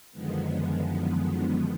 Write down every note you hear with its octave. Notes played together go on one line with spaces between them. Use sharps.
F#2 D3 D#3 F3 G#3 B3